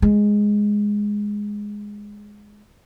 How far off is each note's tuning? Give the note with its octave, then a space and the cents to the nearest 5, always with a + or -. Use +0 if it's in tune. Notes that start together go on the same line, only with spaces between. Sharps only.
G#3 -5